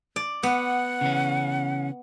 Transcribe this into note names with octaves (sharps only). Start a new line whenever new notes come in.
D5
B3 F#5
C#3 E3 C#4